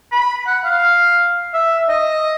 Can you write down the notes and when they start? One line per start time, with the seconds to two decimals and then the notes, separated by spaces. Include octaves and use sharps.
0.12 B5
0.47 F#5
0.65 F5
1.54 E5
1.89 D#5